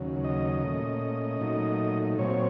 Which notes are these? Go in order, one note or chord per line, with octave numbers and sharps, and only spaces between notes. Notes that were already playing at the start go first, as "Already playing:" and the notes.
Already playing: D#2 C#3 F#3
D#5
A#2 A3 C#4
A#2 F#3 A3 D#4
A#2 F#3 C4 C#5